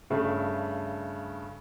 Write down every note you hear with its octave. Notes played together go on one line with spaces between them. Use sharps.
G2 C#3 A3